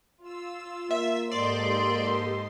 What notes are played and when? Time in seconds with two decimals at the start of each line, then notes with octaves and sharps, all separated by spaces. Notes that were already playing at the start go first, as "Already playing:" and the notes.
0.22 F4 E6
0.91 A#3 E5
1.31 G#2 G4 A4 D5 D#5 C6